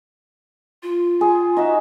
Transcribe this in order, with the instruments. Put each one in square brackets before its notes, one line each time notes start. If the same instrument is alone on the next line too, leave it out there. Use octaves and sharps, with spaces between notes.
[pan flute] F4
[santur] G#4
D#4 F#4 E5